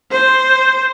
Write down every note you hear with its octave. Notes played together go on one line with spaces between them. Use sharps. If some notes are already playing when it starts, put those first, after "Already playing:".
C5